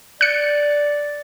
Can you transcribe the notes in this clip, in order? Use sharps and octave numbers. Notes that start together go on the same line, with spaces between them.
D5 F#6 C#7